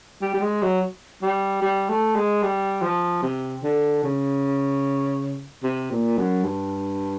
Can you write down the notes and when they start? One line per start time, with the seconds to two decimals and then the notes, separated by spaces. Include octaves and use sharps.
0.22 G3
0.34 G3
0.41 G#3
0.62 F#3
1.22 G3
1.62 G3
1.89 A3
2.15 G#3
2.43 G3
2.82 F3
3.23 C3
3.63 D3
4.04 C#3
5.63 C3
5.91 A#2
6.18 F#2
6.44 G2